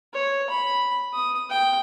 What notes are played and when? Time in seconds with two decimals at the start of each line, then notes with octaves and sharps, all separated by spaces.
0.14 C#5
0.50 B5
1.14 D#6
1.50 G5